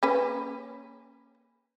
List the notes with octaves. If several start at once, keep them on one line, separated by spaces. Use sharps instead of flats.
A#3 C#4 B4